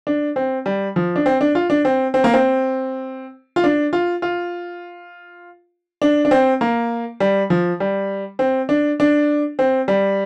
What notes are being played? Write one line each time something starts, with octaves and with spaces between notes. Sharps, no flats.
D4
C4
G3
F3
D4
C4
D4
F4
D4
C4
C4
A#3
C4
F4
D4
F4
F4
D4
D4
C4
A#3
G3
F3
G3
C4
D4
D4
C4
G3